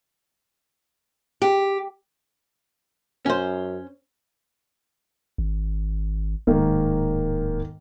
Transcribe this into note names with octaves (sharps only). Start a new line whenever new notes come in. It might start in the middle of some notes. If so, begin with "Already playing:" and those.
G4
F#2 C#4 C5
G#1
D1 G#2 D#3 A#3